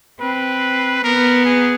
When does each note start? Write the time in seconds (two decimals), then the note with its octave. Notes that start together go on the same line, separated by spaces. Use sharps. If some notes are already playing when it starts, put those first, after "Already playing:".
0.20 C4 B4
1.04 B3 A#4
1.45 G#4